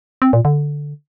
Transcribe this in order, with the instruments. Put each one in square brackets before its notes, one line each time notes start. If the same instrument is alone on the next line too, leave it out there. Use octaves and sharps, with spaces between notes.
[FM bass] C4
A#2
D3